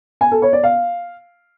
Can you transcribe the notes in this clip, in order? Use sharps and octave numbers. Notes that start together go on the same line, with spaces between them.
G#5
A4
C#5
D5
F5